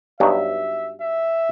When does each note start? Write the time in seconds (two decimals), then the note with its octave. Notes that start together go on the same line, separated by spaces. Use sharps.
0.20 G2 F#3 B3 D#4 F#4 E5
1.01 E5